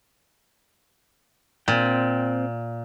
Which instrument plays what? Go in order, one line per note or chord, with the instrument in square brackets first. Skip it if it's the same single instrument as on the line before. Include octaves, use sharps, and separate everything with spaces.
[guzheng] A#2 [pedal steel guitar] C4 G5